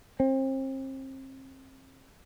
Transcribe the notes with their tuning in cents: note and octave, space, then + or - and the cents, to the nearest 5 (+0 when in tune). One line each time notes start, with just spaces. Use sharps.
C4 +35